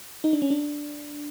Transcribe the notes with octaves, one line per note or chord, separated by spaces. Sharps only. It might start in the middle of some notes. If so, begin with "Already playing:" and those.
D#4
D4
C#4
D4